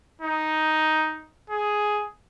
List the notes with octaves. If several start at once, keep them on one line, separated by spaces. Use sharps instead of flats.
D#4
G#4